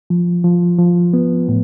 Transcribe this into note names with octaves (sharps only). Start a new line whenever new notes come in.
F3
F3
F3
B3
A2